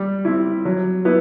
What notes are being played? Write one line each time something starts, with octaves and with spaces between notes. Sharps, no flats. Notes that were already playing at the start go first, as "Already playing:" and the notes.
Already playing: G3
C4 E4
F#3
B3 E4